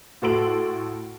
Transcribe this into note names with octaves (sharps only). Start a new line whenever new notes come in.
A2 F#4 A4 C6 D7 F#7